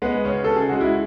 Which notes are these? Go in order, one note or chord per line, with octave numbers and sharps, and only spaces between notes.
G#3 B3
C#3 C#4
C#3 A4
G#4
G#3 F#4
E4